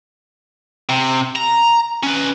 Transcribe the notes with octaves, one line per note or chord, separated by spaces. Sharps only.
C3
A#5
C#4 B4